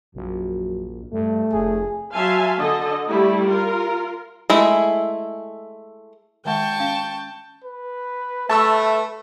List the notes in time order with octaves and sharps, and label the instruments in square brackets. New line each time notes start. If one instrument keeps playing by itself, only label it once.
[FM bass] A#1 [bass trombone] F#2
[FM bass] G2 [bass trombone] A3
[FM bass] F1 [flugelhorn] G#4
[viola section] F#3 E5 F5 G#5 A5 C6
D3 A4 D#5
G3 A3 E4
F4 A#4
[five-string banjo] G#3 A3 E4
[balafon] D#3 G#3 F#5 [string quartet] G5 A5 C#6
[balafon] C#4 F5
[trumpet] B4
[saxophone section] A3 E5 [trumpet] B4 [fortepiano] A5 C#6 E6